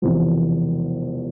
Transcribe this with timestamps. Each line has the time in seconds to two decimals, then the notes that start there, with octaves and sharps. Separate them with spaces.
0.02 E1 E2 C3 F3